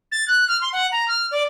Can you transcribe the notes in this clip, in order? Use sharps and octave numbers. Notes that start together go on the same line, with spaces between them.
A6
F#6
F6
C6
F#5
A#5
F6
D5